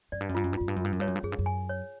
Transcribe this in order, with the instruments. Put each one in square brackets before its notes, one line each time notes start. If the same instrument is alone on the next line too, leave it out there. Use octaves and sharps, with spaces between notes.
[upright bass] F#2 [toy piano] D5
[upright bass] G2
F#2
[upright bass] G2 [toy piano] F4
[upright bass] F#2
G2
[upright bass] F#2 [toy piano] F4
[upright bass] G2
F#2
[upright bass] G2 [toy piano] F4
[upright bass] F#2
[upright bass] G2 [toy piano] C#5
[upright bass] F#2
G2
[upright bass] F#2 [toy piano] G#4
[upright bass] G2
F#2
[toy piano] G#5
C#5